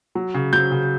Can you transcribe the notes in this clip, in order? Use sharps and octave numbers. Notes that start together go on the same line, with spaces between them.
F#3
C#3
F#3 G6
C#3